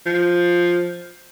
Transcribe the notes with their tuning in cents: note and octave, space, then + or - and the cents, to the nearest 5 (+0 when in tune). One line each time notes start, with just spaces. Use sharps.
F3 +5